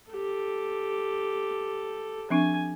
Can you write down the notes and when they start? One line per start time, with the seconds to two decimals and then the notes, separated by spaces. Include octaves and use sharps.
0.12 G4 A4
2.30 F3 C4 D4 G#5